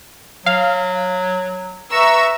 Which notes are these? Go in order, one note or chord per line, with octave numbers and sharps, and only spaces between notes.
F#3 F5
B4 E5 A#5 C#6 E6